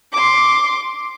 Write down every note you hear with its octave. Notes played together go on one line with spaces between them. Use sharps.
C6 D6